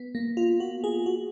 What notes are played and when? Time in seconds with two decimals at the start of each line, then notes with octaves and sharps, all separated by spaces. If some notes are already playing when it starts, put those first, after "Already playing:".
Already playing: B3
0.15 A#3
0.37 F4
0.60 F#4
0.84 G#4
1.06 F#4